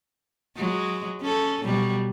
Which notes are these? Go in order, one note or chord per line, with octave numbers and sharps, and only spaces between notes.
F#3 G#3
C#4 A4
B2 F#3 G3